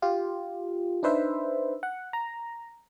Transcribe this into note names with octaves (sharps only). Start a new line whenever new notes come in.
F4 G4
D4 D#4 B4 C5 E5
F#5
A#5